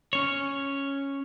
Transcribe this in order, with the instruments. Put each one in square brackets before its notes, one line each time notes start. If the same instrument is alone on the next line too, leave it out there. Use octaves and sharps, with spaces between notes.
[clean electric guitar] C#4 C#5